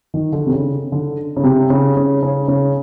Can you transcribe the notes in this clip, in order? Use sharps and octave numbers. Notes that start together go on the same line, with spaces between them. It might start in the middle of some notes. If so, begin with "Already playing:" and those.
D#3
D3
C3
C#3
D3
C#3
C3
C#3
C#3
C#3
C#3